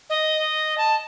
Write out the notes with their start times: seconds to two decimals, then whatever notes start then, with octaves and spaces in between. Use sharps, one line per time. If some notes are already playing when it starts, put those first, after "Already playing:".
0.10 D#5
0.78 A5